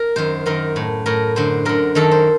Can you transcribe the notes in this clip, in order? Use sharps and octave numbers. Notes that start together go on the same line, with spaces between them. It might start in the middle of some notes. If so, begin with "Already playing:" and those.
Already playing: A#4
F#2 D#3 C5
F#2 D#3 A#4
A2
A2 A#4
F#2 D3 C5
F#2 D3 A#4
F#2 D#3 A4
C5